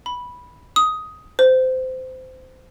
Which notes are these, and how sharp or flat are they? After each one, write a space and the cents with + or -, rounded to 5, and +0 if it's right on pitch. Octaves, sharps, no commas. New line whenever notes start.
B5 -10
D#6 +10
C5 -20